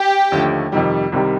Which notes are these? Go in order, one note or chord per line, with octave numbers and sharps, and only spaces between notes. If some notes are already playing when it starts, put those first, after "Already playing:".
Already playing: G4 G5
D#2 D3 F3 A3
F2 C3 D#3 G3
C2 C3 D#3 G3